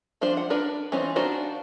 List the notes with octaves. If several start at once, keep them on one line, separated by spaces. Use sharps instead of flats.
F3 D4 F4 C5
F#5
D4 A#4 B4 D5
E3 C4 C#4 D#4 F4
D4 D#4 F4 F#4 C5